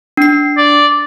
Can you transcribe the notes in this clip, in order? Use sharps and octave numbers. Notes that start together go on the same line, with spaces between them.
D4 C7
D5